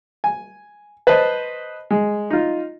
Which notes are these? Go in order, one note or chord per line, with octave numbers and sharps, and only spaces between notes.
G#5
B4 C5 D#5 A5
G#3
D#4 F4